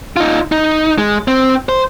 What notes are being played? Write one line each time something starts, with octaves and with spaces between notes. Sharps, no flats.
D#4 F4
D#4
G#3
C4
C5